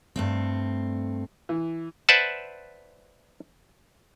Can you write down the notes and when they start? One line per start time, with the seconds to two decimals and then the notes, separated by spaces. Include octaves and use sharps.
0.16 G2 A3 C4
1.49 E3
2.09 B4 C5 D5 E5 F#5 A5